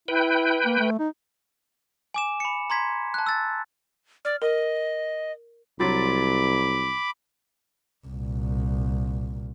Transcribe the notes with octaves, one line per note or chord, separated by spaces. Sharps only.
E4 B4 G5
A#3
A3
D#4
G#5 D6 E7
B5 C#7
A#5 C6 G#6 B6
A5 F#6
E6 A6
D5 F6
A#4 D#5
C2 F#3 B5 C6 D6 A6
C2 A#2